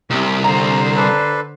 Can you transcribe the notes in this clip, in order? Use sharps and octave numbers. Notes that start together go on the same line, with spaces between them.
C2 C3 G4
D3 C5 A#5
D4 A4 B4